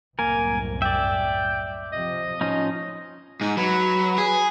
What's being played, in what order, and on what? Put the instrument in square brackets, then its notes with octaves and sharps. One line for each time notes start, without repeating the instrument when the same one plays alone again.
[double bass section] C2 F#2 A2 [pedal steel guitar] A#3 A#4 [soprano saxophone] G#5
[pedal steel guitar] D5 E5 [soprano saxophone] G5
[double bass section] C3 F3 [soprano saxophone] D#5
[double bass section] A2 [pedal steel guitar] F3 C#4 D#4 [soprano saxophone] D#5
[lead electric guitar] G#2 [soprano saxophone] D#4
[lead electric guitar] F#3 [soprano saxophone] B4
[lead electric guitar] G#4